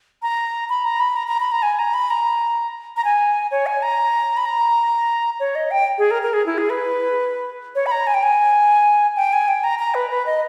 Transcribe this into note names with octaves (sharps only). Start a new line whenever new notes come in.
A#5
B5
A#5
B5
A#5
A#5
B5
A#5
G#5
A#5
B5
A#5
A#5
G#5
C#5
G#5
A#5
B5
A#5
C#5
D#5
G5
G#4
A#4
A#4
G#4
E4
G#4
B4
C#5
B5
A#5
G#5
G5
G#5
G5
G#5
G5
A#5
A#5
B4
B4
D#5